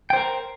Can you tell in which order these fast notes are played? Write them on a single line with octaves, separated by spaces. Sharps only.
G5 C5 A#4